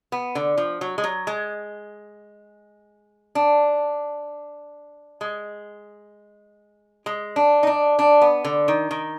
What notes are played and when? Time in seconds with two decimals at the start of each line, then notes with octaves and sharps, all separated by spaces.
0.12 B3
0.35 D3
0.58 F3
0.81 F#3
0.98 G#3
1.04 F#3
1.27 G#3
3.35 D4
5.21 G#3
7.06 G#3
7.36 D4
7.63 D#4
7.67 D4
7.99 D4
8.21 B3
8.45 D3
8.68 D#3
8.91 D#3